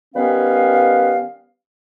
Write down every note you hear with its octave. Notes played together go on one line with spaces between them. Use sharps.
D#3 G3 B3 C#4 B4 F5